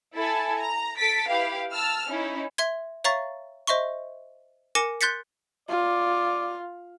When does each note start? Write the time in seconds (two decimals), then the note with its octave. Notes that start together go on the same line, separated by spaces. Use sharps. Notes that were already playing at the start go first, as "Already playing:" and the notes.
0.14 E4 A4 G#5 A5
0.58 A#5
0.98 A4 A6 B6 D7
1.29 E4 G4 B4 F5
1.73 A5 E6 F6
2.07 C#4 D#4 E4
2.58 E5 C6 G#6
3.04 C#5 E5 F5 A#5 C#6 A6
3.67 C5 D#5 E5 C6 C#6
4.75 A#4 G#5 D6 A#6 C#7 E7
5.01 C6 F#6 G6 A6 B6 C#7
5.69 F4 D5